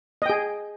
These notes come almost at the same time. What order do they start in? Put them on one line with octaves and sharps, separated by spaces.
D#5 G5 G#4